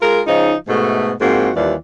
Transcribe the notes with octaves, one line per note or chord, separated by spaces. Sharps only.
G#3 F4 A#4
C#3 F3 D#4
G#2 B2 A3
G#2 F3 A#3 C4 F#4
D#2 E3 G3 F4 D5